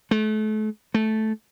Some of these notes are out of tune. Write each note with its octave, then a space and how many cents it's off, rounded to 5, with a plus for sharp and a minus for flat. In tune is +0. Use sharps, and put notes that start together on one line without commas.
A3 -35
A3 -10